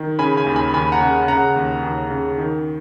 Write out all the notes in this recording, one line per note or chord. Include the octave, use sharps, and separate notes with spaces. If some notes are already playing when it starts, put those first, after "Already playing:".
Already playing: D#3
C#3 G#5 B5
G#5 B5
D#2
G#5 B5
D#2 G#5 B5
F#5 A#5
C#3
C#3 F#5 A#5
D#2
D#2
C#3
D#3